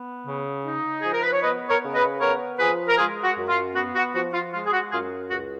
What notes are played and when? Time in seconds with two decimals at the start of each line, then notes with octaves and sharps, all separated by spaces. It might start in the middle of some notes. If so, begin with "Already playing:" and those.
Already playing: B3
0.27 C#3
0.65 D#4
1.02 F3 G#4
1.13 A#4
1.23 B4
1.33 C#5
1.42 B3 B4 D#5
1.69 A#4 C#5
1.81 C#3
1.95 B4 D#5
2.20 B3 A#4 C#5
2.59 F3 G#4 B4
2.89 A#4
2.98 G#3 F4 G#4
3.24 F#4
3.37 F#2
3.49 F4
3.75 B3 F#4
3.95 F#4
4.15 F3 F#4
4.33 F4
4.53 G#3 F4
4.66 G#4
4.73 F#4
4.92 F#2 F4 G#4
5.31 C#2 F#4